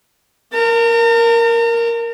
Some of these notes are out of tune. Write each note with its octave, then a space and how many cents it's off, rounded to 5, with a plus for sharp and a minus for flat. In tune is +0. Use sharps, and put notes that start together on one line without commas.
A#4 +0 A#5 -45